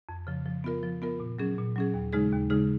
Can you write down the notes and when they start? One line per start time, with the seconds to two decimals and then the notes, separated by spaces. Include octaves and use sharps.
0.09 F2
0.27 C#3 F3
0.46 F3
0.64 B3 F4 A#4
0.83 F3
1.02 B3 F4 A#4
1.20 A#2
1.38 F#3 C#4 G#4
1.58 A#2
1.76 F#3 C#4 G#4
1.94 D#2
2.13 C#3 G#3 D#4 G#4
2.32 D#2
2.50 C#3 G#3 D#4 G#4